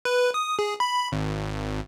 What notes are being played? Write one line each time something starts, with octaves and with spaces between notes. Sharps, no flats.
B4
D#6
G#4
B5
G#1